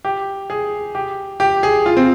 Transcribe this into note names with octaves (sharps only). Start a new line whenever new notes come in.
G4
G#4
G4
G4
G#4
F4
C4